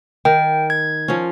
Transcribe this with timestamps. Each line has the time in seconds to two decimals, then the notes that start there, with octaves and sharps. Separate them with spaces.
0.25 D#3 G5
0.70 G#6
1.08 F3 C#4